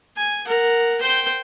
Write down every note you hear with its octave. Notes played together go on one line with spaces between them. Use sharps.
G#5
A#4 F#5
C5 G5